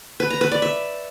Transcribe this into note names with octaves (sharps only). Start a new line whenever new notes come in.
B4
A#5
B4
D5
E5